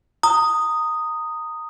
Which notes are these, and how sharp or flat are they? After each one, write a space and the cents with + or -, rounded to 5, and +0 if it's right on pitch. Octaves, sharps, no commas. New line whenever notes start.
A#5 -20 D#6 +0